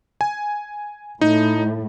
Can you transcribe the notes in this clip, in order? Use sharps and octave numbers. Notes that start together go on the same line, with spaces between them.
G#5
A2 D#4